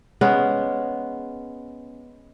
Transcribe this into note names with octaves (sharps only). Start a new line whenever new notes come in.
G#3 B3 C#4